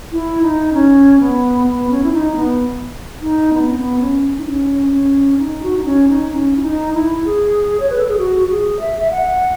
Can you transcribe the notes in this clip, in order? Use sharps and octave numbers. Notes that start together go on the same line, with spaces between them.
E4
D#4
C#4
B3
B3
C#4
E4
D#4
B3
D#4
B3
C#4
B3
C#4
D#4
C#4
C#4
D#4
F#4
D#4
C#4
D#4
C#4
E4
D#4
E4
G#4
C#5
B4
A4
G#4
F#4
F#4
G#4
E5
E5
F#5